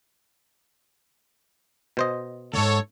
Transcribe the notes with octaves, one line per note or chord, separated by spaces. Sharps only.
B2 C5 D#5
D2 G#2 A4 C#5